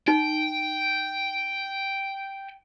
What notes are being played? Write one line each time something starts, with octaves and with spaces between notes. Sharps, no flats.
D#4 G5